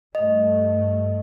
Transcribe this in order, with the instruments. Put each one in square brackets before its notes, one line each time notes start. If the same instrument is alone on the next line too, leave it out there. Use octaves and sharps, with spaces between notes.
[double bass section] G2 A3 [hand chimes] D#5